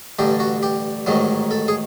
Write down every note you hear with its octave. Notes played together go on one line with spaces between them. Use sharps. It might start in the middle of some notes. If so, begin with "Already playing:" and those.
A1 G2 D3 G4
F#4
G4
A1 G#2 D#3 F#3
A4
G#4